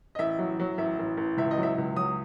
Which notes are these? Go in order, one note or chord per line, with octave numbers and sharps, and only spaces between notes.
D#5
A1 E5
F#3
F#3
A1 E5
A1
A1
C#2 E5
D#5
F#3
E5
C#2
F#3 D#6